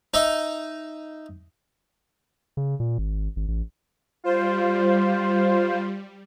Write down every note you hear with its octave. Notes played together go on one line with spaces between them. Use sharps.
D#4 D#5 E5
C#3
A#2
G#1
G#1
A1
G3 F4 C5